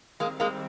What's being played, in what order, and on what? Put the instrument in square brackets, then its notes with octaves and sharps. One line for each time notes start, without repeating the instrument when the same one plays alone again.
[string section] D#3 G3 C4 [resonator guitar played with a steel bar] G#3 A#3
[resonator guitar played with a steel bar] G#3 A#3